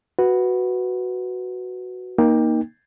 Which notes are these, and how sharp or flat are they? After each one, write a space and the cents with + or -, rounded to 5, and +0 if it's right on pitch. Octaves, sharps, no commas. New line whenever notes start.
F#4 +0 B4 +0
A#3 +15 D#4 +0 G5 +20